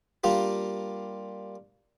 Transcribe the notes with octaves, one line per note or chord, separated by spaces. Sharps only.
G3 A#3 D4 F4 G4